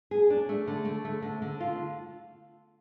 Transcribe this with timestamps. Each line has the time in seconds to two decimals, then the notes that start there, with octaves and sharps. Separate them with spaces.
0.11 G#4
0.30 D4
0.49 A3
0.67 D3
0.85 A3
1.05 A3
1.22 D3
1.42 D3
1.60 F4